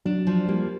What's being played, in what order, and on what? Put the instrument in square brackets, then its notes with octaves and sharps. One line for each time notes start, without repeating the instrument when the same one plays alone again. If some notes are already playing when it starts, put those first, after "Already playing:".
[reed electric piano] F#3 [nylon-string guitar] D4
[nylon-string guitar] F3
[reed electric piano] G3 [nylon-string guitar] A#3